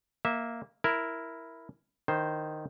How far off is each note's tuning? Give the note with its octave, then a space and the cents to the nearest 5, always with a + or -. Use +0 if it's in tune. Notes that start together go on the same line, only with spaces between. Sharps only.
A#3 +0 E5 -15
E4 +0 A#4 +0
D#3 -10 E4 +0 C5 +0